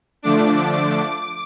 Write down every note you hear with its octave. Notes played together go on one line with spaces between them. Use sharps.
D3 F3 A3 D4 D6
D6